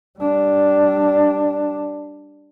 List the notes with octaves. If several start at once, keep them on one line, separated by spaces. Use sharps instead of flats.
G3 D4